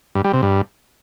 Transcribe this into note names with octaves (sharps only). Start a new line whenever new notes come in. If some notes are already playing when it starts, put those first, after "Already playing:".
G2
G3
C3
G2